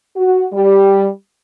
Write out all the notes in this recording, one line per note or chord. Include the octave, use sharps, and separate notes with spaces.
F#4
G3